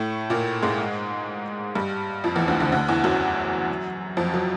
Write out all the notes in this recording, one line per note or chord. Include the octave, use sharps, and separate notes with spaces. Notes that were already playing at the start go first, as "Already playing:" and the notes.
Already playing: A2 A3
A#2 A#3
G#2 G#3
G2 G3
F2 F3
E2 E3
D2 D3
D2 D3
D2 D3
E2 E3
F#2 F#3
F2 F3
F#3